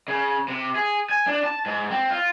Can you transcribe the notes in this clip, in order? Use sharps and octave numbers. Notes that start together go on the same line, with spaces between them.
C#3
C3
G#4
G#5
D4
A5
G#2
C4
F4